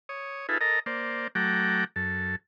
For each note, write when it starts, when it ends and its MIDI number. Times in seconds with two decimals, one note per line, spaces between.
0.09 0.47 73
0.09 0.47 87
0.49 0.58 63
0.49 0.58 65
0.49 0.58 68
0.49 0.58 69
0.49 0.58 71
0.49 0.58 76
0.61 0.80 69
0.61 0.80 70
0.61 0.80 75
0.61 0.80 82
0.86 1.27 58
0.86 1.27 72
0.86 1.27 74
1.35 1.84 54
1.35 1.84 57
1.35 1.84 78
1.35 1.84 79
1.35 1.84 82
1.35 1.84 86
1.96 2.36 42
1.96 2.36 69